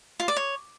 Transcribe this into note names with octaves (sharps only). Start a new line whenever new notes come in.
F4
D5
C#5